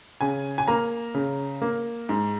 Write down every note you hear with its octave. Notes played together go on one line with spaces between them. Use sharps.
C#3 G#5
G#5
A#3 A#5
C#3
A#3
G#2